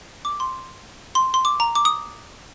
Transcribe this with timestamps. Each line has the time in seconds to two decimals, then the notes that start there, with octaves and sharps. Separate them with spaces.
0.25 D6
0.40 C6
1.15 C6
1.34 C6
1.45 D6
1.60 A#5
1.75 D6
1.85 D#6